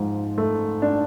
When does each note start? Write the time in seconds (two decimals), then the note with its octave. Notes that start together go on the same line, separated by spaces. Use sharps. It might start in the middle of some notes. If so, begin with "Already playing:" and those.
Already playing: G#2 F3
0.38 A3
0.82 D4